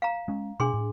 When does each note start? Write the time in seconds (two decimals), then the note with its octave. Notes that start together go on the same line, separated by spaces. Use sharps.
0.02 F5 A#5
0.28 G#3 C#4
0.60 B2 D4 G#4 C6
0.74 A2